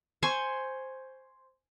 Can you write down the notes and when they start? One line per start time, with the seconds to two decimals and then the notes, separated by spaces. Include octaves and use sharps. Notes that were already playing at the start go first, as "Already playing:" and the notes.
0.23 C5 G#5 C6 C#6